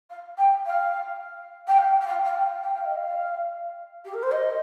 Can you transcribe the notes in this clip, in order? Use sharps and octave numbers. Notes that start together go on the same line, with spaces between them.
F5
G5
F5
G5
F5
G5
F5
F5
G5
G5
F5
D#5
F5
G4
A#4
C5
D#5